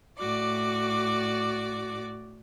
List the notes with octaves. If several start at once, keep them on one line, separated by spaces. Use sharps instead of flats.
A2 F#4 D5 D6